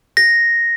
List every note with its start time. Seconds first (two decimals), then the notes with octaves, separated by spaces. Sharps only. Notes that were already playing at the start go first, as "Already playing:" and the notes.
0.17 A#6